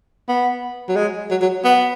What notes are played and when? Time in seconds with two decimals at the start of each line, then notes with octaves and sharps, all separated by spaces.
0.29 B3
0.89 F#3
0.96 G#3
1.31 F#3
1.42 F#3
1.64 B3